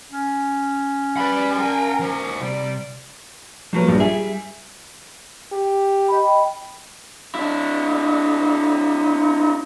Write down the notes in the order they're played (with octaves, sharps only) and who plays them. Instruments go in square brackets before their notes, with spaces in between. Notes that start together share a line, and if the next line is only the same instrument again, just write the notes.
[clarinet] C#4
[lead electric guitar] G3 B5 [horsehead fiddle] B4 D5
[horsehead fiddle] A#4 [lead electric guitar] G5 G#5
[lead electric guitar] D#2 C5
[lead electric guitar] C3 [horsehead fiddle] G3 D5
[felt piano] D#1 B4 [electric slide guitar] F3 F#3 A#3
[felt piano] A#1 G2
[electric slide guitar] G3 G#4 [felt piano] E5
[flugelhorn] G4
[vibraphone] D#5 G5 B5
[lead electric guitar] D4 E4